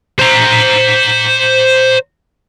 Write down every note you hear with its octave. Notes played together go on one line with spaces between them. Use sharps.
C5 A#5